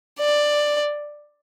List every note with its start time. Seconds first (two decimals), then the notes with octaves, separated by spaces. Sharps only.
0.19 D5